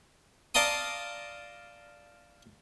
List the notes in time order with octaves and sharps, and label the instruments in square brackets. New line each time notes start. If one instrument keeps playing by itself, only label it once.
[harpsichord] D5 F5 A5 A#5 C6 D#6